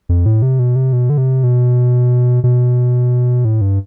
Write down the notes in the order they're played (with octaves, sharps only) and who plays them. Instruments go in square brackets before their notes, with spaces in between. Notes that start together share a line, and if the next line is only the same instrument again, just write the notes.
[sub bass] F2
A2
C3
B2
C3
B2
D3
C3
B2
B2
A2
G2